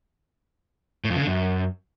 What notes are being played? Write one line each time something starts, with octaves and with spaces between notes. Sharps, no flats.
A2
F2
C#3
D3
F#2